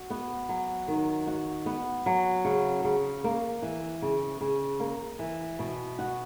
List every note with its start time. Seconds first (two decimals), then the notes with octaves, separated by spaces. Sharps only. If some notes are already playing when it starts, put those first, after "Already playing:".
Already playing: F#4
0.10 B3
0.49 F#3
0.88 D#3
1.27 F#4
1.66 B3
2.06 F#3
2.45 C#3
2.84 C#3
3.24 A#3
3.62 E3
4.02 C#3
4.41 C#3
4.80 A#3
5.19 E3
5.59 B2
5.99 F#4